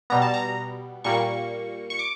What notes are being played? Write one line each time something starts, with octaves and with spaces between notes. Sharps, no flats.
B2 G3 B3 A#5
A5
A#5
A#2 G3 A#3 C#6
C#6
D6